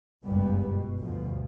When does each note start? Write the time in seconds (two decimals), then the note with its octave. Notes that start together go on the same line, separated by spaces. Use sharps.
0.24 F#1 C#2 G2 A#2 G3 B3
0.68 B2
1.00 D2 G2 B2 F3